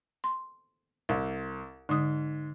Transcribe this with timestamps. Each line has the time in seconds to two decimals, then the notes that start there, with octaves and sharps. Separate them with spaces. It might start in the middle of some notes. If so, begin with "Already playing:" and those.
0.24 C6
1.09 C2
1.89 G#2 D3 D#6